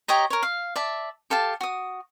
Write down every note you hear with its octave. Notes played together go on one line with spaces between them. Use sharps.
G4 C#5 D#5 A#5
A#4 C#5
F5
D5 E5 A5
G4 A4 F5 A5
F#4 D#6